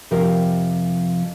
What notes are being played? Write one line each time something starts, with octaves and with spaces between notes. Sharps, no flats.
F2 C3 F3 G4 A#4